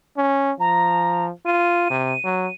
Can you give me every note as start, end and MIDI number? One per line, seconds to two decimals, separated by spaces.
0.17 0.52 61
0.59 1.30 53
0.59 1.25 82
1.46 1.87 65
1.46 2.54 99
1.90 2.14 48
2.24 2.47 54